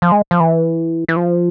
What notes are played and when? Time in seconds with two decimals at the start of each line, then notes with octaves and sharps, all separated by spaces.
0.02 F3
0.12 G#3
0.31 F3
0.40 E3
1.08 E3
1.17 F3